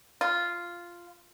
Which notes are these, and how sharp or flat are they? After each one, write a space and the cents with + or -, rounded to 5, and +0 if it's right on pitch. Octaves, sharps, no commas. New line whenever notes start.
F4 -5